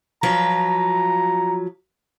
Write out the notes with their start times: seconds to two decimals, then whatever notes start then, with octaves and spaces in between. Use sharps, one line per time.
0.23 F3 F#3 B4 A#5